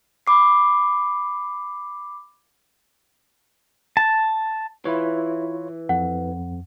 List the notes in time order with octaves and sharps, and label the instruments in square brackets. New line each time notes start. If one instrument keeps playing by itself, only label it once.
[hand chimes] B5 D6 C7
[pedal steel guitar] A5
[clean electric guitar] E3 [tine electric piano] E4 F4 C#5
[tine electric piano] F2 [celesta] F#5